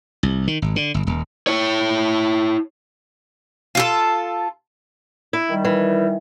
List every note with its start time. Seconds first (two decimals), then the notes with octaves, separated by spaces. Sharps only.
0.23 C2
0.48 D#3
0.62 G#1
0.76 D3
0.94 G1
1.07 D#1
1.47 E4 C#5
3.75 F4 F#4 A4
5.33 E4
5.50 D#3 G3
5.65 E3